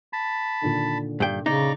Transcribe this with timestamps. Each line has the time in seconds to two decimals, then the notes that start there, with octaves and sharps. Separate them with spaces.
0.13 A5 B5
0.61 A#2 D3 D#3
1.20 G2 G5
1.46 C#3 D#4 D5 A#5